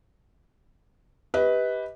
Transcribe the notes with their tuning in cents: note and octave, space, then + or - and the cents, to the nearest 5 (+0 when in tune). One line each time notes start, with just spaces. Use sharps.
G4 +0 B4 +0 D#5 +35